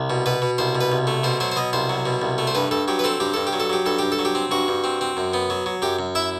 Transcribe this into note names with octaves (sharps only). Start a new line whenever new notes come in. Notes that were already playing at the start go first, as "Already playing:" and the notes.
Already playing: C2
B2
B2 B4
B2
C2 C5
B2
B4
C2
A3
B2 C5
F#3 C5
C5
B2 D#5
C2 C5
F#3
B2
C2
A3
C5
G2 B4
G2 A4
F#3 G4
B4
C4 A4
G2 G4
G2 A4
G4
F#3
A4
F#3 G4
G2 A4
G2 G4
A4
F#3
G4
C4
G2 F#4
G2
C4
C4
F#2
B3
F#3
F#3
F#2 G4
F#2
E4 E5